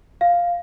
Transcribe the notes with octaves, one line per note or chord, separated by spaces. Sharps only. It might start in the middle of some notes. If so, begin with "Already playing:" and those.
F5